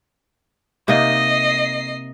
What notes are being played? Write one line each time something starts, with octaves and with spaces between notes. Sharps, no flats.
C3 A#3 D#4 D#5 C7